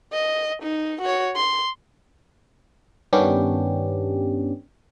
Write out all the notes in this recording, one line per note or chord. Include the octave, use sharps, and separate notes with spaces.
D#5
D#4
F#4 C#5
C6
G2 D#3 B3 C#4 D4 G4